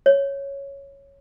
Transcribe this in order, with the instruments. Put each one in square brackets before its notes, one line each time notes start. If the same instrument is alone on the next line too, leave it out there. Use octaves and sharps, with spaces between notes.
[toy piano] C#5